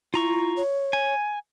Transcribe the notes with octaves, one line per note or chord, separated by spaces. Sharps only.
E4 F4 A#5 C#6
C#5
G#5